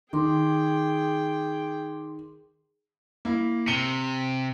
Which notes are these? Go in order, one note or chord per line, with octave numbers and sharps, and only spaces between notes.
D#3 G#4 G5 C6 D6
A#3 E4
C3 C#7 G7